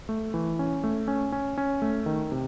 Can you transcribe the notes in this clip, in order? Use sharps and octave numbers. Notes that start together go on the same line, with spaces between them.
A3
E3
C#4
A3
C#4
C#4
C#4
A3
D#3
C3